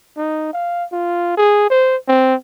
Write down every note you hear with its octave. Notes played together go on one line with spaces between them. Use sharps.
D#4
F5
F4
G#4
C5
C4